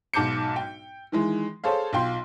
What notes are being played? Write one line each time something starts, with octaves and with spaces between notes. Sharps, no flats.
B1 G#2 A5 D6 G6 C#7
G5
D#3 E3 G#3
G#4 A4 C5 C#5 F5
B1 F4 G5 C6